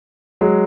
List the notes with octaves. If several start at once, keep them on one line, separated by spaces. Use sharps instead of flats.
F#3 G#3